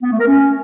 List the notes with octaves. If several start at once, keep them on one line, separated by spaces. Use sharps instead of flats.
B3
A3
A#4
C#4